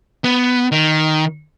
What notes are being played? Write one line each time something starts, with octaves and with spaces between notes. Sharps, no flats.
B3
D#3